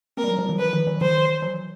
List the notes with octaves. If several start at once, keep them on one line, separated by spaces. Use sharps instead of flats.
A#3 C4 A#4
G3
E3 F#3
F3 G3
E3 F#3
D#3 F3 B4
D#3 F3
E3 F#3
D#3 F3 C5
E3 F#3